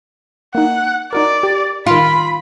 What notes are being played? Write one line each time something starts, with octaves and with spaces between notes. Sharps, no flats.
A#3 D#4 F#5
D#4 F#4 A#4 D5
G4
D#3 F4 B5 D7